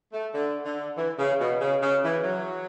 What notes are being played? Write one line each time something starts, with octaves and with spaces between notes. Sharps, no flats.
A3
D3
D3
E3
C#3
B2
C#3
C#3
E3
F#3